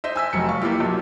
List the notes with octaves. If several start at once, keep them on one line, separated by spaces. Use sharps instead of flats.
C5 D#5 E5
G#5 E6 B6
F1 F#3 C#7
F5 C#6
A#3 E4 F4 G4
B1